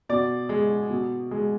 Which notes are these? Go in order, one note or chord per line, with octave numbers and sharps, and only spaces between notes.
B2 D5
G#3
B2
G#3